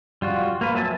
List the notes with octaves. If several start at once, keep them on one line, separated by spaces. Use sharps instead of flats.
G3 F4 F#4
A#3 A#4 B4
F#3 E5 G#5 A5